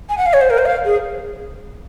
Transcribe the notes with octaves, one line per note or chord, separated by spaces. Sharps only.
G#5
F#5
F5
C#5
C5
A#4
C5
F5
G#4